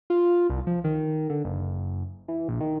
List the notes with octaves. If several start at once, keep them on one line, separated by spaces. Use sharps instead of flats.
F4
C2
F3
D#3
D3
F#1
E3
A#1
D#3